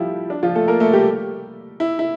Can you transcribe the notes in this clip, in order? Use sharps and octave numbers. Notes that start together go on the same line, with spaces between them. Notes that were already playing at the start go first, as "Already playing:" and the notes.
Already playing: F3 G3 E4 F4 G4
D4
F3 F4
A3 A4
A#3 A#4
A3 A4
G3 G4
E4
E4